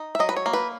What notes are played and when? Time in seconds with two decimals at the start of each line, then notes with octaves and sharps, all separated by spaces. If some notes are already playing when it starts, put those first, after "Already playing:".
Already playing: D#4
0.15 E5
0.19 F#3 D#5
0.29 B4
0.37 C#5
0.46 A#3
0.53 B4